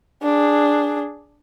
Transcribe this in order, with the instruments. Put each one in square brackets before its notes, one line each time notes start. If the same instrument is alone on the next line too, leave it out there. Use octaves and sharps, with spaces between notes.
[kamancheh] D4 G#4